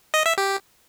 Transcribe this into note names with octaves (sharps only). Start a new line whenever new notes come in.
D#5
E5
G4